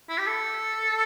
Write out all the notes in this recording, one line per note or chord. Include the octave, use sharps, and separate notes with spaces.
E4
G4
A4